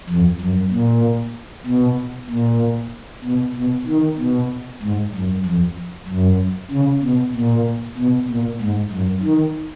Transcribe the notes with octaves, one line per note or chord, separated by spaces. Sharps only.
F2
F#2
A#2
B2
A#2
B2
B2
D#3
B2
G#2
F#2
F2
F#2
C#3
B2
A#2
B2
A#2
G#2
F#2
D#3